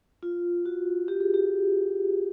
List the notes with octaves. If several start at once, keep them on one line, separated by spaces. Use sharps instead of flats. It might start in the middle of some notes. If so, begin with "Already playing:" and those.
F4
F#4
G4
G#4
G4